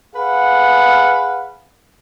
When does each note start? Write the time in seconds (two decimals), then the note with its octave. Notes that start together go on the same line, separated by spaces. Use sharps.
0.15 G#4 B4 F5 F#5